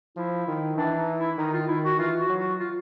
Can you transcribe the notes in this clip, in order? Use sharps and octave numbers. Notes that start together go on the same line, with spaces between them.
F3 E4
D#3
E3 D4
D#4
E4
D#3 D#4
F4
D#3 E4
F#4
E3 F4
F#4
F#3
F#4
F4